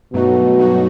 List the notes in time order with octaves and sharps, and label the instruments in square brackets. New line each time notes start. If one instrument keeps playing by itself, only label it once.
[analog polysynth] G2 F#3 A3 D#4 F#4 [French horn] B2
[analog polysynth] G2 F#3 A3 D#4 F#4